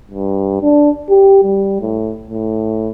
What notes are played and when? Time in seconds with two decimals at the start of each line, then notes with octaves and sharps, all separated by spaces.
0.11 G2
0.61 D4
1.09 G4
1.44 G3
1.80 A2
2.30 A2